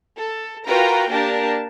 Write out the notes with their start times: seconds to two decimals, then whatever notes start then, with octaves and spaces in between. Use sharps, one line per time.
0.19 A4
0.67 F4 F#4 A#4 B4 G5 A#5
1.11 A#3 D4 G4 A#4 A5